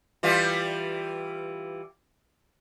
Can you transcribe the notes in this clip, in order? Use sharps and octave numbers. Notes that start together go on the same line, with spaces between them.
E3 G3 F4